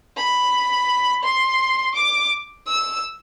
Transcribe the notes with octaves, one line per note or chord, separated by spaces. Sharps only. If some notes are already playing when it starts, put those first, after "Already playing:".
B5
C6
D6
E6